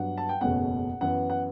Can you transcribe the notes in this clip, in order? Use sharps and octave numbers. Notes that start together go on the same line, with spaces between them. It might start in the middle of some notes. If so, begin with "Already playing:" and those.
Already playing: G2 F#3 B3 D4 F#5
A5
G5
F#1 E2 B2 A3 C#4 F#5
F#2 E3 B3 F#5
F#5